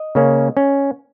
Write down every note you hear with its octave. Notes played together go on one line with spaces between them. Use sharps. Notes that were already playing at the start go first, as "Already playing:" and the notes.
Already playing: D#5
C#3 A#3 C#4
C#4